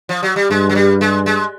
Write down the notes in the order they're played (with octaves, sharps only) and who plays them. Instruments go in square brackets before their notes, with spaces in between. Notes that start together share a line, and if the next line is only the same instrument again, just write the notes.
[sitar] F3
F#3
G3
[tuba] G2 [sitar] G#3
[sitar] F#3
G3
G#3
G#3